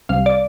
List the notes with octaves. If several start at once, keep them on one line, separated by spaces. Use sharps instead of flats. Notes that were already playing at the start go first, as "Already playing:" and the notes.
C2 C3 G3 F5
D5